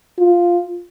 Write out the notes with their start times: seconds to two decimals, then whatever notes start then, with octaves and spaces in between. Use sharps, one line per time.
0.18 F4